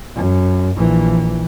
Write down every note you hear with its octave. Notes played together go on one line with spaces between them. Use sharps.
F#2
A#1 E3